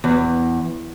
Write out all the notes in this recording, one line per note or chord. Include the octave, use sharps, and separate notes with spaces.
E2